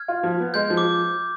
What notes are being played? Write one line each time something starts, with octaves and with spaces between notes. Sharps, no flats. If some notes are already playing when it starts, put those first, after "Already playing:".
Already playing: F6 G#6
F4
F3
B3
G#3 G6
F3
D6